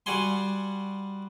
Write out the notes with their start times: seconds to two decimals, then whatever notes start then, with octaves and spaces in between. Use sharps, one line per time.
0.06 G3 F#4 F#5 G#5 C6